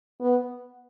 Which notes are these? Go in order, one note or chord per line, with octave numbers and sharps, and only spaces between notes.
B3